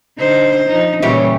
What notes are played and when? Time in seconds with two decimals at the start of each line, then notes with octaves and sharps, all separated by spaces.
0.18 D3 D#4 C5
0.66 F3 D#4
1.03 A#2 C#3 E3 G3 G4 C#5